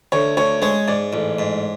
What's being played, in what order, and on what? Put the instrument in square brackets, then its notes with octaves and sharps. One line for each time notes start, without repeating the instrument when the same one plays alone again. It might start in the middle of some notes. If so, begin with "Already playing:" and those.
[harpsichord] D2 [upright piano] C#5
[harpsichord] D2 [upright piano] C#5
[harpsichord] G#3 [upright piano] C#5
[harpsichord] G#2 [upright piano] D5
[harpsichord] A1
G#2